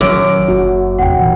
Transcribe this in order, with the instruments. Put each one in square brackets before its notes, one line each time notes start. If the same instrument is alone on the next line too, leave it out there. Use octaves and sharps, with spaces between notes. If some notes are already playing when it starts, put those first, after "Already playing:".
[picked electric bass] A#1 D#3 F#3 [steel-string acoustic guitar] F#2 [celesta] D6 E6 D7
[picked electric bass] F#1 [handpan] F#4
[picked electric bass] A1 E2 C3 [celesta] F#5 G5
[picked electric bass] D#1 A#2 E3